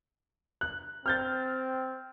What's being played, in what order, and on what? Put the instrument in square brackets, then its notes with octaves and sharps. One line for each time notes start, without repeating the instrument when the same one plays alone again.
[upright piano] F#6
[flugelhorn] C4 [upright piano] F6 G6 A6